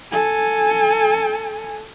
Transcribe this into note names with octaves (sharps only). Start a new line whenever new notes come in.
A4 G#5